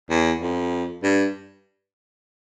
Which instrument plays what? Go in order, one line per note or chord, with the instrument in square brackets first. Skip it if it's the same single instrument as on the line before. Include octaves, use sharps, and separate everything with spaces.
[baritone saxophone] E2
F2
G2